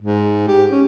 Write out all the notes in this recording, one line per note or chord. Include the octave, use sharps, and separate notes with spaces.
G#2
G4
C#4